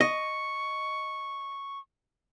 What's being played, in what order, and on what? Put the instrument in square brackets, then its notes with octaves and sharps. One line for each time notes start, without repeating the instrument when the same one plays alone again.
[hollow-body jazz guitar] D#5 [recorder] C#6